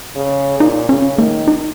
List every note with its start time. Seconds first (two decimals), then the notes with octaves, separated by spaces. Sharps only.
0.16 C#3
0.60 A#2 D#4
0.89 C#3 C#4
1.18 D#3 A#3
1.48 D#4